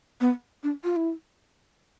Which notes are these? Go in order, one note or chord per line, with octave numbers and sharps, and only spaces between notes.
B3
D4
F4
E4